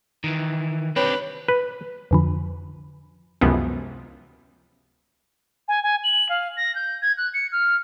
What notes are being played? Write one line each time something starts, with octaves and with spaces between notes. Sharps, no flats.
D#3 E3
C4 D4 G4 B4 C#5
B4
F2 D3 F3
C#2 F#2 C3 E3 F3 B3
G#5
G#5
F#7
F5
A#6
G6
G#6
F#6
C#7
F6